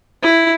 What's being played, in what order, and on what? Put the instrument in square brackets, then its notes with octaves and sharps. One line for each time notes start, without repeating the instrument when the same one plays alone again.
[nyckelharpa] E4